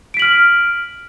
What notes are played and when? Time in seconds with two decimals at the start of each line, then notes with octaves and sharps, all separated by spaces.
0.14 D7
0.17 B6
0.19 F#7
0.22 F6